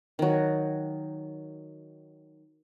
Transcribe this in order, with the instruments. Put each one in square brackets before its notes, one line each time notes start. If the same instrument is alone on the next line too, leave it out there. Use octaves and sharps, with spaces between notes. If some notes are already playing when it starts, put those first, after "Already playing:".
[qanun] D#3 F#3